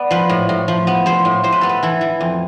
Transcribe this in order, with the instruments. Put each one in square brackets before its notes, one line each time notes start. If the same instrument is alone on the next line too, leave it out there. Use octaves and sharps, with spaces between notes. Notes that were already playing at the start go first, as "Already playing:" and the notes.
Already playing: [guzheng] B3 D5
F3 B4
A2
A2
F3
B3
F3 C5
A2
A2 C5
B4
B3 A4
B4
E3 A4
E3
F2